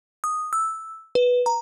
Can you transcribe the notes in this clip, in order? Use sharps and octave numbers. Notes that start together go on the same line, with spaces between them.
D#6
E6
B4
A#5